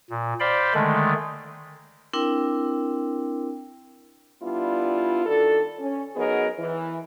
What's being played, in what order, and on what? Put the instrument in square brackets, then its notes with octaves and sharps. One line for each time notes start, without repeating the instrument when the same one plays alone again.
[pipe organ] A#2
C5 D5 F5 G5 B5
D3 D#3 G#3 A3
[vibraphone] C4 D4 E4 A#4 G5
[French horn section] G3 B3 D4 E4 F4
D#3 D4 F#4 A4
C#4
F#3 B3 D#4 G#4 A#4 D#5
E3